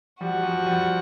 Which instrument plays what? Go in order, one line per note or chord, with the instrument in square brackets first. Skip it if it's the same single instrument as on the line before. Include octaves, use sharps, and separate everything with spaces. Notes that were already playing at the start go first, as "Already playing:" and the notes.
[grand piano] F3 G3 [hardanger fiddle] F#4
[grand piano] F3 G3
F3 G3